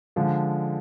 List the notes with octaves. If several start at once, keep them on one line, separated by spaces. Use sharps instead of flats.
D3 F3 G#3